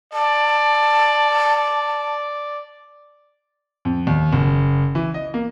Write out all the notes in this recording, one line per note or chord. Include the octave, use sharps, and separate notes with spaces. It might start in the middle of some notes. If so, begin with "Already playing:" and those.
D5 A5
F2
D#2
F#1
E3
D#5
A#3